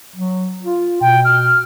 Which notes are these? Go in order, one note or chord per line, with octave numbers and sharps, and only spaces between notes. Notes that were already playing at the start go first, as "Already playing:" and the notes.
F#3
F4
B2 G5
F6